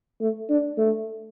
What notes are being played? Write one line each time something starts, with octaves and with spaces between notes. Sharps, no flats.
A3
D4
A3